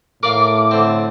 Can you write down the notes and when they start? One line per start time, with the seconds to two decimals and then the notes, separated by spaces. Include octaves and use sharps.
0.23 A2 A#4 D5 F5 D6
0.71 D3 C4